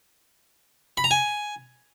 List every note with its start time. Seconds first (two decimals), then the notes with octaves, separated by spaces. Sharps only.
0.97 B5
1.04 A#5
1.11 G#5